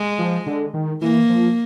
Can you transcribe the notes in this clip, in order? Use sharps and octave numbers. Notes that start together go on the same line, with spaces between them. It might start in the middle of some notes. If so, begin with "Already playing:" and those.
Already playing: G#3
F3
D3
D#3
E3 A#3
F3